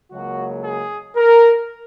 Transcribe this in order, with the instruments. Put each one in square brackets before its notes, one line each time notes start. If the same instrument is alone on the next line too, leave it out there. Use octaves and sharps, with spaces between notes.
[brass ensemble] C#2 C#3 F#3 A#3 F#4
G#4
A#4